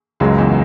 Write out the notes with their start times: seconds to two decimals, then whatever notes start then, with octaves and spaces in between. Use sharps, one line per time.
0.20 C#2 F#2 C#3 F#3 G#3
0.38 E2 E3